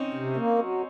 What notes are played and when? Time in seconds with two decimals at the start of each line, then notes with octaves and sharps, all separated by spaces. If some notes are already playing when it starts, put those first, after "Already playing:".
Already playing: C4 C#4 D#4
0.14 C3
0.36 A#3
0.59 F#3